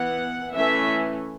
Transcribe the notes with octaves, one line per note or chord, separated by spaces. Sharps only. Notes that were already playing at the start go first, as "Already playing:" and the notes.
Already playing: E3 B3 F#5
E3 A3 C#4 E5